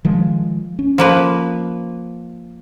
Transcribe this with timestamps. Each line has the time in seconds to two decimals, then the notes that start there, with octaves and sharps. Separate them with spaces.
0.05 D#3 F3 G#3
0.79 C#4
0.98 F3 A#3 B4